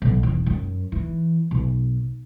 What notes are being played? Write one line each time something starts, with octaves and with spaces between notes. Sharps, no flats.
B1
E1
F#2
E3
B1